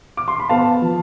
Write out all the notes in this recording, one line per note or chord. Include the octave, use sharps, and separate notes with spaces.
D6
C6
B5
B3 F5 A5
F3